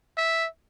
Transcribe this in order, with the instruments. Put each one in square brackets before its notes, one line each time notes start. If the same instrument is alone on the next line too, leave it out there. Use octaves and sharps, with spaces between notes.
[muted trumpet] E5